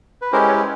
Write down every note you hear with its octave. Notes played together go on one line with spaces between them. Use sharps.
B4
G#3 C#4 E4 G4 A#4 C5
B4 C#5